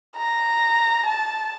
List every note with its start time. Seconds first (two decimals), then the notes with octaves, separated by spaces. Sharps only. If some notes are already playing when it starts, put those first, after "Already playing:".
0.17 A#5
1.06 A5